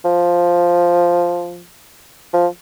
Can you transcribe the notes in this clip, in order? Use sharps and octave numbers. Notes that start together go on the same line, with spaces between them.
F3
F3